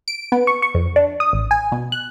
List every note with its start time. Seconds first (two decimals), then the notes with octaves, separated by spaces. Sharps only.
0.08 D7
0.32 B3
0.47 C#6
0.62 C#6
0.75 F2
0.96 D4
1.20 D#6
1.33 A1
1.51 G#5
1.72 B2
1.92 F#6